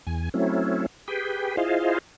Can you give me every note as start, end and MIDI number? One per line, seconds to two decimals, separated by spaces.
0.07 0.29 40
0.07 0.29 80
0.34 0.86 54
0.34 0.86 57
0.34 0.86 60
0.34 0.86 61
0.34 0.86 64
1.08 1.56 67
1.08 1.56 68
1.08 1.56 71
1.08 1.56 79
1.57 1.98 64
1.57 1.98 65
1.57 1.98 68
1.57 1.98 72
1.57 1.98 75
1.57 1.98 77